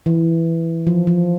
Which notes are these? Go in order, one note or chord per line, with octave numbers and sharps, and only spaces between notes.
E3
F3
F3